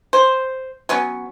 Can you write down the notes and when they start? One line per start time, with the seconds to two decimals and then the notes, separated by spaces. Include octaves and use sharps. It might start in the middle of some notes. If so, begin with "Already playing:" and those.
0.13 C5
0.89 F#3 B3 C#4